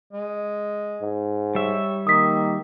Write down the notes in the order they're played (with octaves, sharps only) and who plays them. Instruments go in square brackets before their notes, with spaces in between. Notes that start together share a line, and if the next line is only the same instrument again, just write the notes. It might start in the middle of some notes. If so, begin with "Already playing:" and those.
[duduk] G#3
[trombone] G#2
[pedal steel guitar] G3 E5 [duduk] C#5
[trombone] D#3 [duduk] A#3 [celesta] D#6 B6